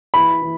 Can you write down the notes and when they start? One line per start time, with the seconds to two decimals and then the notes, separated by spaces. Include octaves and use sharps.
0.14 E3 B5
0.42 E3